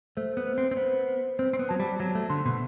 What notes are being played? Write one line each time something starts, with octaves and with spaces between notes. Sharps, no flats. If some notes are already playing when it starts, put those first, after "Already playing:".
A3 C5
B3
C5
C4
C4
B3 C5
C5
C4 C5
C4
B3
F#3 A5
G3
F#3 A5
A3
D3 C6
B2